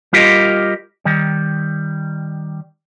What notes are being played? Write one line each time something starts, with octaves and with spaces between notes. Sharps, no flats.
G3 F4 G4 A#4 D#5
D#3 G3